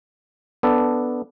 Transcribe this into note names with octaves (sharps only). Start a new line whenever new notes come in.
B3 D4 A4